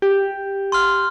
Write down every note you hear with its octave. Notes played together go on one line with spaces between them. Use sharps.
G4
C6 F6